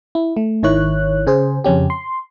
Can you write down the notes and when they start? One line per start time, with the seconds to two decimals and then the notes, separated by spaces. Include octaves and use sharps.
0.15 E4
0.37 A3
0.63 G#1 D#3 E4 C#5 F#6
1.27 C#3 G#4 C5
1.64 F2 C#3 C#4 G4
1.90 C6